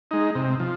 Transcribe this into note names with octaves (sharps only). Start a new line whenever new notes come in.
G#3 D#4
C3
F3